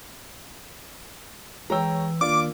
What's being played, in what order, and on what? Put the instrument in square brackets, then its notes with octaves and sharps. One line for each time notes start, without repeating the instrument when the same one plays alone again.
[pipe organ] E3 [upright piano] G#3 C#5 E6 [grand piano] G5 A#5
[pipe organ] D#3 A#3 [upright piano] D4 [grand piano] F4 [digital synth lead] D6